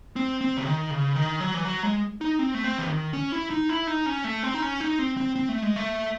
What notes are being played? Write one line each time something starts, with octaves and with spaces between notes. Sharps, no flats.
C4
C4
C#3
D#3
C#3
D#3
F#3
E3
F#3
G#3
D#4
C4
A3
C4
E3
D#3
C#4
E4
D#4
E4
D#4
C#4
A3
C4
D#4
C#4
D#4
C4
C4
C4
A3
G#3
A3